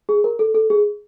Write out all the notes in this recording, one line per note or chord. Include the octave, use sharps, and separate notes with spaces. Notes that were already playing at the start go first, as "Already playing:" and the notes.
G#4
A#4
A4
A4
G#4